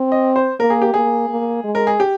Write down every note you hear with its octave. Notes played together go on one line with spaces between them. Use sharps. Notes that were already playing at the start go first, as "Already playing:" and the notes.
Already playing: C4
D#5
C5
A#3 A#4
G#4
G4
A#3 G#4
A#3
G#3
A#4
G#4
G4